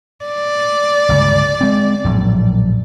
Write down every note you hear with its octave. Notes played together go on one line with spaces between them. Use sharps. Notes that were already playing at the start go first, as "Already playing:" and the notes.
D5
G1 C#2 C#3
G#3 C4
A#1 F#2 A2